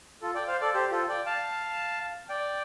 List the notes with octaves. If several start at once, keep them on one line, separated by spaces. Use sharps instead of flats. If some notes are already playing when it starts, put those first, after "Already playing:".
F4 A4
D5 G5
C5 F5
A4 D5
G4 C5
F4 A4
D5 G5
F5 A5
D5 G5